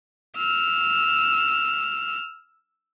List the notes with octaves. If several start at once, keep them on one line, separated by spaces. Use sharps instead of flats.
E6 F6